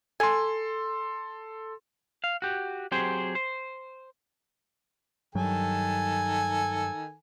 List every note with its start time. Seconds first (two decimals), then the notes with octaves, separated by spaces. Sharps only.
0.20 A4 G#5 C6
2.24 F5
2.42 F#4 G4
2.92 F#3 C4 G4 G#4 C5
3.35 C5
5.35 G2 D#3 F#3 G3 A4 G#5